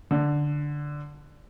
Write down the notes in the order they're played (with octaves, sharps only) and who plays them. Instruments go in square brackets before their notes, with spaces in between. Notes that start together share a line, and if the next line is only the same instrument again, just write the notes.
[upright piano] D3